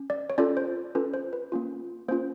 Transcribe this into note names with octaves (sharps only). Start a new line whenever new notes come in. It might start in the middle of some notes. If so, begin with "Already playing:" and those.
Already playing: C#4
D5
C#5
C#4 F4 A4 D5
C5
C#4 F4 A4 B4
C5
B4
A#3 C#4 F4
A#3 C#4 F4 C5